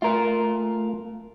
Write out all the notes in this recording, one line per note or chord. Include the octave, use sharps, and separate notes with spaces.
A3 F4 A#4